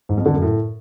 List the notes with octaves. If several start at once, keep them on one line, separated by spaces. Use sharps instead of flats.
G#2
F2
D3
F#2
A2